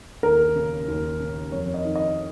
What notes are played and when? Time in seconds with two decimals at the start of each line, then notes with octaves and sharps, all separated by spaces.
0.23 D#2 A#4
0.56 C#3
0.88 D#2
1.20 C#3
1.52 F2 C#5
1.74 D#5
1.85 D#3
1.95 D#5